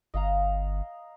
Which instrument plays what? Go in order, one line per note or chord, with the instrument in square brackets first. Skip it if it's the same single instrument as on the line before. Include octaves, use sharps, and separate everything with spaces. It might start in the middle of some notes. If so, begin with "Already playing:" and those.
[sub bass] G1 [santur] D#5 F5 A#5